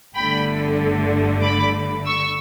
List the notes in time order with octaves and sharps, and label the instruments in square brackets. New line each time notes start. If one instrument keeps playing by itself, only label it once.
[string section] G1 G2 D3 A3 G5 B5
B5 D6
C#6 E6